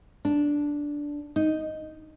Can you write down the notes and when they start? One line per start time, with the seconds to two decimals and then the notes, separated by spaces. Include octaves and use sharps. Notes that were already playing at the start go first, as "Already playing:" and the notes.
0.25 D4
1.36 D#4